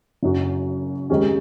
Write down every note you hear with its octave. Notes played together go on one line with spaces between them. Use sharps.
F#1 F#2 F#3
D#2 D#3 G#3 C#4